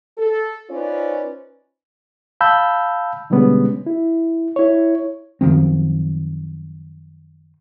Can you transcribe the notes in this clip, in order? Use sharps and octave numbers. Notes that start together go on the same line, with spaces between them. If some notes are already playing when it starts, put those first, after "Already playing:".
A4
C#4 D#4 F4 B4 C5 D5
F5 A5 B5 E6 G6
B2 D3 G3 G#3 B3 C#4
E4
E4 C#5
F#2 D#3 F3 C4